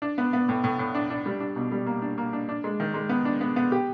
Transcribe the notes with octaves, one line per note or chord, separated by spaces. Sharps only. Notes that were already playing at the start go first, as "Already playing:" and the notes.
D4
B3
B3
A2
A2
A2
D4
D4
G3
D4
B2
G3
A#3
D4
A#3
D4
D4
G#3
D#3
G#3
B3
D4
B3
B3
G4